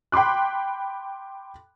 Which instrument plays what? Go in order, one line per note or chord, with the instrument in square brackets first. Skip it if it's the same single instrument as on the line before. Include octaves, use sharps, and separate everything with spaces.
[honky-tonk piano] G5 B5 C6 D6 F#6